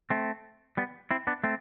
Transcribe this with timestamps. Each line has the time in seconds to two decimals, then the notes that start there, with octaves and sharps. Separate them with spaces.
0.10 A3 C4
0.77 G3 B3
1.11 C4 E4
1.27 B3 D4
1.44 A3 C4